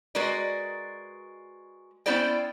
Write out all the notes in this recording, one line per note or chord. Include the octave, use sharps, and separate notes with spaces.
G#3 F#4 A#4 B4 D5
B3 C#4 E4 C5 D5 G5